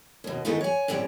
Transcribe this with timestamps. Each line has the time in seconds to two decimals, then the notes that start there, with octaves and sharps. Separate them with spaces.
0.24 D#2 B2
0.45 D#3 G#3 A3 B3 D#4 E4
0.61 C#5 G#5
0.88 F#2 A2 G3 C4 C#4